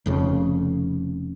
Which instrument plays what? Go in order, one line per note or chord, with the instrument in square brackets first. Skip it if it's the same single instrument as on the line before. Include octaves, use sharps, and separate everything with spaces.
[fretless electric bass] F1 F2 C#3